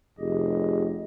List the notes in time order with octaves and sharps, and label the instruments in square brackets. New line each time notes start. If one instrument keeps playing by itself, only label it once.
[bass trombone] F1 [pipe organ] G4 G#4 D#5